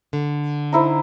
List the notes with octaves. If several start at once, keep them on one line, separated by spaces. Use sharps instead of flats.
D3
D#4 E4 C5